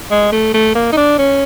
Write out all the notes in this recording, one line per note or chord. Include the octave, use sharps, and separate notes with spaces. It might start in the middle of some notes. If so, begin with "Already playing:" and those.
G#3
A3
A3
A#3
D#4
D4
C#4